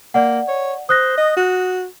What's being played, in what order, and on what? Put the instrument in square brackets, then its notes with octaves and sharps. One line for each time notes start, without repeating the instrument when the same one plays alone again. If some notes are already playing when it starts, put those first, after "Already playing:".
[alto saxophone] A#3 [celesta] D5 F#5
[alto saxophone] C#5
[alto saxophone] C5 [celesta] D#6 F#6 A#6
[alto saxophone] D#5
F#4